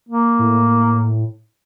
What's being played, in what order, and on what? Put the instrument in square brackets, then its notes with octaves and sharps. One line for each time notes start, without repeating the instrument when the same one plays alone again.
[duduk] A#3
[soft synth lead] A2